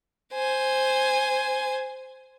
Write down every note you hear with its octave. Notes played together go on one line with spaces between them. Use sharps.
C5 G#5